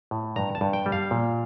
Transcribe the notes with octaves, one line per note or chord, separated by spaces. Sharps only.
A2
G2 A#5
A5
G2
G5
G3
F5
A#2